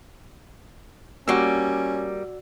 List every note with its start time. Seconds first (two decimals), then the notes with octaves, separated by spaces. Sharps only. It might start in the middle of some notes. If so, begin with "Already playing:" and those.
1.28 G3 A#3 C#4 F#4 D5 E6